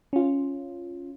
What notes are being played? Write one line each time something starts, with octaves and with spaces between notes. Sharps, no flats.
C#4 F4